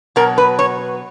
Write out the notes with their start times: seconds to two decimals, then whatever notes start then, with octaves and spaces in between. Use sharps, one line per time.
0.16 B2 F#3 A#4
0.38 B4
0.59 C#5